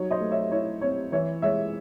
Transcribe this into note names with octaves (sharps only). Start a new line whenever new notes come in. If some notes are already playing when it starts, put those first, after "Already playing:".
Already playing: F#3 D#4 C#5
C5 D#5
A3
C#5 E5
E4 C#5
C4 C#5
E3 C#5 E5
G#3 C#5 E5